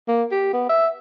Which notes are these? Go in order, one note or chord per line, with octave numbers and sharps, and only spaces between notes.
A#3
G4
B3
E5